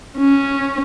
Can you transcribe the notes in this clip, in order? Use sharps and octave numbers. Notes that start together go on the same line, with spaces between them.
C#4